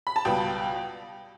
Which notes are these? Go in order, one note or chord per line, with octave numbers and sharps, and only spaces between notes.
B5
A5
C#2 B2 G3 B3 G5